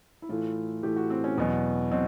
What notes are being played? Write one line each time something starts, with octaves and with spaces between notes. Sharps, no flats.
E4
A2 E3 A3 F4
A2 E3 A3 G4
F#4
C4
C#4
E2 B2 F#3 B3
B2 F#3 C4